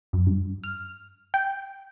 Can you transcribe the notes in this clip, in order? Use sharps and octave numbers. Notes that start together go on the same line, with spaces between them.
F#2
G2
F6
G5